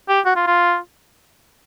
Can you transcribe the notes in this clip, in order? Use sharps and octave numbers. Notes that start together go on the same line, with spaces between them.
G4
F#4
F4
F4